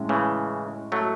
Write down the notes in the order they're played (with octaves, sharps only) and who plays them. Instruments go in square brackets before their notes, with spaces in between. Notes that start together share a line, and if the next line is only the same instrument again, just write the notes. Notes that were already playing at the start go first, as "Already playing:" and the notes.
Already playing: [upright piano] A2 G#3 C#4
[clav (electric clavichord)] C#3 E3
F#3 A3